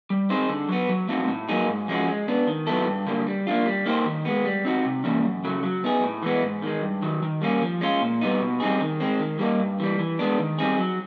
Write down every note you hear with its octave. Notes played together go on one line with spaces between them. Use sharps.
G3
C4 D#4 G#4 C5
D3
F#3 B3
F#3
A3 C4 D#4 F#4
A2
F#3 A#3 D#4 G#4
G#2
F3 G#3 C#4 F#4
G#3
B3 D4
D#3
F#3 B3 E4 A4
G2
D3 G3 A#3
G3
A#3 D4 F4
G3
A#3 D#4 G4 C5
D#3
G#3 B3
G3
C4 D#4 F#4
C3
E3 G3 A#3 C#4
F#2
C#3 F#3 A3
F#3
B3 D#4 G#4
A2
E3 G#3 B3
G#2
D#3 G#3
G2
D#3 F#3
D#3
G3 A#3 C#4
F3
G#3 C#4 F4
A#2
G3 B3 D#4
B2
G3 C4 D#4 G#4
D#3
G#3 C4
D#3
G3 A#3 D#4
G2
E3 G3
E3
G#3 B3 D4
D#3
G3 C4 D#4 G#4
F#3